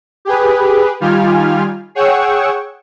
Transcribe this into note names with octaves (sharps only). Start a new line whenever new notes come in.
G4 G#4 B4
D#3 G3 F4 G#5 F6
G#4 C#5 F#5 G5 C#6 E6